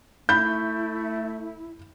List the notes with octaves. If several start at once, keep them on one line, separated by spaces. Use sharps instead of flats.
A3 E4 B5 G6